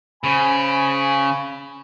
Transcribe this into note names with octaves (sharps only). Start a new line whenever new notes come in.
C#3 C5 G#5 B5